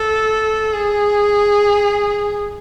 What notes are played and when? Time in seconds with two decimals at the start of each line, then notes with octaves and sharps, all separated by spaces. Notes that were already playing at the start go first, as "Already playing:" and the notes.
Already playing: A4
0.72 G#4